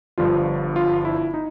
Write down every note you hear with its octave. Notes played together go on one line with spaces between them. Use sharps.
G1 G2 D3 F3 F4
F4
E4
D#4